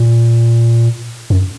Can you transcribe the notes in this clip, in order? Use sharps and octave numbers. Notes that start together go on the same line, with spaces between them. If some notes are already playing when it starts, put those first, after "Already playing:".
Already playing: A#2
F#2